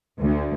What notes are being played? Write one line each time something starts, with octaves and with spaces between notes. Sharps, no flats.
D2